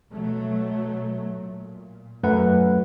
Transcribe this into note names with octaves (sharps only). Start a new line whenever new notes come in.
B2 F#3 A3
A#2
F#2 A3 B4 F#5